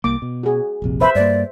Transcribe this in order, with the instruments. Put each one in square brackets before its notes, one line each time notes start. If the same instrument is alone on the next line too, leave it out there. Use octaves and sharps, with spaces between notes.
[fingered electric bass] C2 A#3 [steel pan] D6
[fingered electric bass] B2
[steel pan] F#4 G#4
[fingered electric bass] F1 A#1 C3
[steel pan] B4 C5 E5 [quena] B5
[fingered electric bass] G2 A#3 [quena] D5